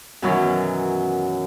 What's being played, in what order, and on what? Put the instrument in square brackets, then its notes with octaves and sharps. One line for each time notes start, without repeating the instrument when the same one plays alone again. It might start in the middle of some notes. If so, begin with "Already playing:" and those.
[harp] F#2 B2 D#3 E3 F#3